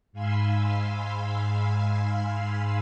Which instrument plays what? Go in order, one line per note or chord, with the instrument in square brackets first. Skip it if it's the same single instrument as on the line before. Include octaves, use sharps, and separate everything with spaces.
[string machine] G#2 F5 G#5 B5 C6 E6